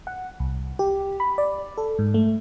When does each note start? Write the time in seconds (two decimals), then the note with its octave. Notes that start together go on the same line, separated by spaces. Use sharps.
0.07 F#5
0.40 C2
0.79 G4
1.20 B5
1.38 D5
1.78 A4
1.99 G#2
2.14 A3